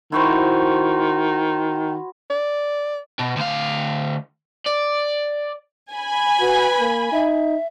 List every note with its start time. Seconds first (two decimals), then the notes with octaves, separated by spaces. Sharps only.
0.12 D#3 E4 F#4 C5
2.30 D5
3.20 B2
3.37 D2 F5
4.66 D5
5.91 G#5 B5
6.40 F#4 B4
6.80 A#3
7.12 D#4 E5